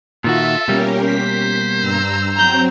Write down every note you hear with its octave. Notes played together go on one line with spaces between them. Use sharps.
A#2 D#3 F4 F#4 A4 E5
B2 G3 A#3 C#4 G4 A#4
C5 B6
G2 A#5 E6
F#3 C4 A#5 G6